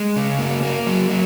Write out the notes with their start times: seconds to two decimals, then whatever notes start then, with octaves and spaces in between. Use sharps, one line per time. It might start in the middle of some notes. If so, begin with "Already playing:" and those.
Already playing: G#3
0.16 C#3
0.39 A#3
0.63 A#3
0.87 F#3
1.10 F#3